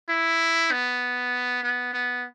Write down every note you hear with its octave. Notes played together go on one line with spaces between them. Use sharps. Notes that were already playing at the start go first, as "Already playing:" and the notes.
E4
B3
B3
B3